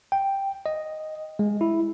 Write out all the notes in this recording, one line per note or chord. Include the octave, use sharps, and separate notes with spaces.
G5
D#5
G#3
E4